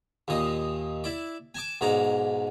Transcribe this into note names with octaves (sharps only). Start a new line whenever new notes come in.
D#2 A#2 D#5
E4 D5
G#5 A5 D6
B1 G#2 D5 A#5